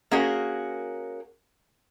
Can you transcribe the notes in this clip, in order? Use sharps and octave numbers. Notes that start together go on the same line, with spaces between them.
A#3 C#4 F#4 G#4 A#4